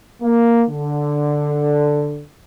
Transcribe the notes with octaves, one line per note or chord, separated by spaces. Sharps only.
A#3
D3